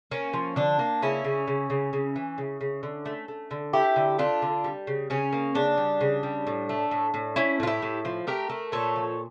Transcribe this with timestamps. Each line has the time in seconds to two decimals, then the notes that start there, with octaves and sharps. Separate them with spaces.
0.11 A#3 C#4
0.33 F3
0.56 D3 D4
0.79 A#3
1.02 C#3 C#4 E4
1.24 C#3
1.47 C#3
1.70 C#3
1.93 C#3
2.16 E3
2.38 C#3
2.61 C#3
2.83 D3
3.06 A3
3.28 A3
3.51 D3
3.73 A3 E4 G4
3.96 D3
4.18 A3 D4 F4
4.42 D3
4.64 G3
4.87 C#3
5.10 C#3 C#4
5.33 A#3
5.55 C#3 D4
5.78 G3
6.01 C#3
6.23 G3
6.47 A2
6.69 A3
6.91 A2
7.14 A2
7.36 A3 C#4 E4
7.60 A2 F4
7.67 E4 G4
7.82 A2
8.05 F3
8.27 A3 G4 A#4
8.50 A3
8.72 A#2 A4 C#5
8.96 F3